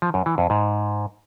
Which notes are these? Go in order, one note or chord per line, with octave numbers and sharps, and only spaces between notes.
F3
F#2
E3
F2
G#2